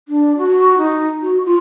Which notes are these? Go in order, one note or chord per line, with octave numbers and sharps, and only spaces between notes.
D4
F#4
D#4
F#4
F4